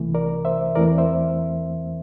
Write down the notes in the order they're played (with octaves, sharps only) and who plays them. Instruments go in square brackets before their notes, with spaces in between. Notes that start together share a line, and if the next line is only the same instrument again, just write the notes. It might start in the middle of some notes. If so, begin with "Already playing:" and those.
Already playing: [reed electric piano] C2 C3 E3 A3
A#4 D5
C5 E5
E2 E3 A3 C4 A#4 D5
C5 E5